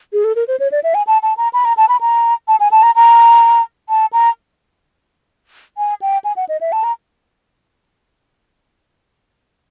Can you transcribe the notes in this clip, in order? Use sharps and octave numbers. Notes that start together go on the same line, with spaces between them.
G#4
A4
A#4
C5
C#5
D5
E5
G#5
A5
A5
A#5
B5
A#5
A5
B5
A#5
A5
G#5
A5
A#5
A#5
A5
A#5
G#5
G5
G#5
F#5
D#5
E5
A5
A#5